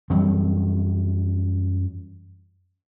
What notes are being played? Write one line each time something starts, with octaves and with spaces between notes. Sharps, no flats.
F#2 E3 G3 C4